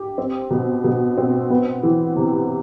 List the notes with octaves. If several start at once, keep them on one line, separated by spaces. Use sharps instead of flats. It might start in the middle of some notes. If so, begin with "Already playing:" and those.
Already playing: G4
C4
B2
B2
C4
B3
E3
C3